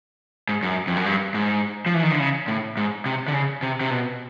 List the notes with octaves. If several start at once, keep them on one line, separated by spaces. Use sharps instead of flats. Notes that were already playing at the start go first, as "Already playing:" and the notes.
G#2
F#2
F2
F#2
G2
G#2
F3
E3
D#3
D3
C#3
A2
G#2
C3
D3
C#3
C3
C3
B2